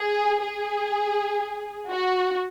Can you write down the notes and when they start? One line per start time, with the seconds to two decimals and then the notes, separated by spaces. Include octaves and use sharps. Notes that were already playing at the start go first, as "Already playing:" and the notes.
Already playing: G#4
0.42 G#4
1.91 F#4